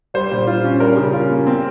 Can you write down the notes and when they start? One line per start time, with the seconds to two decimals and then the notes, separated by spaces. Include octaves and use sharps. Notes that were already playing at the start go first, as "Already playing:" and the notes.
0.14 G3 C5
0.32 A#2
0.47 F4
0.64 C#4
0.80 G3 A#4
0.97 C#3
1.13 F4
1.30 A#3
1.47 C4